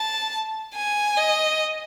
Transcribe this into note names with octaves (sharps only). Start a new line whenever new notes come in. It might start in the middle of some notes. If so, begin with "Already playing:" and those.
Already playing: A5
G#5
D#5